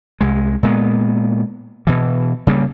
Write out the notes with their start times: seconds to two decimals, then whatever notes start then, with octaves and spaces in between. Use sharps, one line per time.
0.21 C2 G#3
0.63 A#2 G#3 B3
1.87 B2 E3
2.47 C#3 G3 A#3